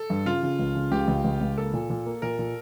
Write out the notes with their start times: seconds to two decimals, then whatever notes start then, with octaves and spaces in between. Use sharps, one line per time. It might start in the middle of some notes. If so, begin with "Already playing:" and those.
Already playing: A4
0.10 G2
0.26 C#3 F4
0.43 C#3
0.59 C#2
0.75 C#3
0.91 C#2 G4
1.08 C#2
1.24 C#2
1.41 C#2
1.57 A#3 A4
1.73 A#2
1.90 A#2
2.06 A#3
2.22 A#2 A#4
2.39 A#2